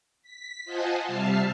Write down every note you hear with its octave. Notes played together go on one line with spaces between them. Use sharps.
B6
F4 C5 D#5 F#5 G#5 A5
C3 G3 E5 A5 F6 C7